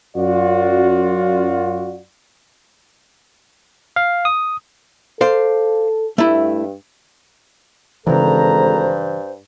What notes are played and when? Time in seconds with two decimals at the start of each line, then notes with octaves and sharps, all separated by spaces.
0.16 F#2 F4 F#4 D5
3.96 F5
4.25 D#6
5.21 A4 C5 D5 F5
6.18 G2 A3 E4
8.07 G#1 G2 C#3 E3 A4 C5 A#5